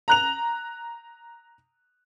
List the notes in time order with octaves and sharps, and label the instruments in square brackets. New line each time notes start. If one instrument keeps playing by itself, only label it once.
[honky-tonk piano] A#5 F#6 F7